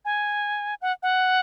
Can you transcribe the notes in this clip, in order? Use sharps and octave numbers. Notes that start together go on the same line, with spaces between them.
G#5
F#5
F#5